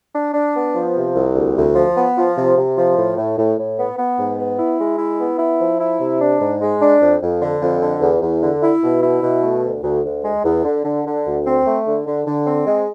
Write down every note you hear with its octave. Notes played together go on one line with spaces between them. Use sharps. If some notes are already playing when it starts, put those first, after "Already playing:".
D4
D4
B3
F3
C3
C2
D2
D2
F3
B3
F3
C3
C3
F3
A2
A2
A2
A2
B3
B3
G#2
B3
E4
G#3
E4
B3
E4
F3
E4
C3
D4
G#2
G#3
D4
F2
F2
D3
F2
D3
E2
E2
D3
E4
B2
E4
B2
A3
D2
D2
D2
G#3
E2
D3
D3
D3
D2
C4
A3
D3
D3
D3
C4
G#3